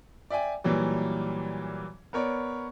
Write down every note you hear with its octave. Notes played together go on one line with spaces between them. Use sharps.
D5 E5 G5 G#5
A#2 E3 F#3 G3
B3 A#4 C#5 D5